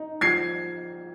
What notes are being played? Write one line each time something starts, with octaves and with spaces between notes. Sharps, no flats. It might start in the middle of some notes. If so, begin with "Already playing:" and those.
Already playing: D#4
F3 G#6 C7